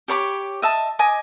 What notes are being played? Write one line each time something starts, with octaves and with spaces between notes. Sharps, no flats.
G4 C#5 B5 D6
D#5 E5 A5
D#5 G#5 D6